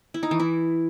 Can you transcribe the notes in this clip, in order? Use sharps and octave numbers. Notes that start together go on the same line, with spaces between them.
E4
D#4
E3
E4